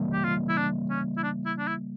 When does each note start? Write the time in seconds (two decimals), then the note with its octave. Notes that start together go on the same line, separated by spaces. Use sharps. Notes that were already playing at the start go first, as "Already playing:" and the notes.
Already playing: C#3 E3 G3 A#3
0.13 G4
0.24 F4
0.49 E4
0.57 D4
0.90 C#4
1.17 E4
1.23 D4
1.45 E4
1.59 D4
1.67 E4